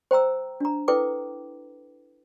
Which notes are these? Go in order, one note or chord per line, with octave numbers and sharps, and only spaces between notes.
C5 G5 A#5 E6
D4 A#5
E4 A4 B4 G5 D6